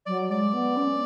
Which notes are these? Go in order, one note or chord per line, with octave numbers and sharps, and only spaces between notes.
F#3 D5
G#3 D5
B3
C#4